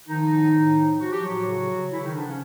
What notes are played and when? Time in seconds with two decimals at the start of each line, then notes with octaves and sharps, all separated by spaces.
0.08 D#3 F3 D#4
0.32 A2
0.54 A2
0.78 F3
1.00 F3 F#4
1.12 G4
1.23 A2 F#3 F#4
1.46 C#3
1.69 C#3
1.92 C#3 E3 E4
2.03 D#3 D#4
2.14 D3 F3 D4
2.26 C#3 C#4